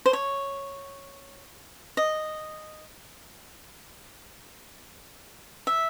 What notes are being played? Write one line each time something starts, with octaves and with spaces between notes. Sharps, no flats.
C5
C#5
D#5
E5